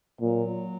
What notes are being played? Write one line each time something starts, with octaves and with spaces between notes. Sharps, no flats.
A#2 F#3